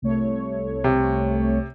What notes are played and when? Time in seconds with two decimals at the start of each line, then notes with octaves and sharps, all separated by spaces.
0.02 C2 A3 C#5
0.84 C3